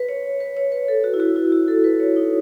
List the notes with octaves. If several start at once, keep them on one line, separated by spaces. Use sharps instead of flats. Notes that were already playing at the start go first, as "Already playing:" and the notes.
Already playing: B4
C#5
B4
C#5
B4
A4
F#4
E4
F#4
E4
F#4
A4
B4
C#5
D#4